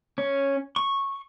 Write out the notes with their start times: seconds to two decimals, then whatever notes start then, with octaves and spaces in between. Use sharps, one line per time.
0.18 C#4
0.76 C#6